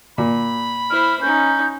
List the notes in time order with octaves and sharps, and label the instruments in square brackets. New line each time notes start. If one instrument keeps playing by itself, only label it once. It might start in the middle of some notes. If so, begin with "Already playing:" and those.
[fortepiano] A#2 [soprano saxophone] B5
[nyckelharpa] E4 C5 [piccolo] F6
[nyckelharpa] C#4 D#4 [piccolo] G6